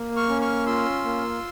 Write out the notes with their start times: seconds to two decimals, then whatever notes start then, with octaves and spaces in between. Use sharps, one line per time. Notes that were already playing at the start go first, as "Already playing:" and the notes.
Already playing: A#3
0.16 C#6 F6
0.29 C#4
0.41 C#6 F6
0.66 F4 C6 E6
1.05 A#3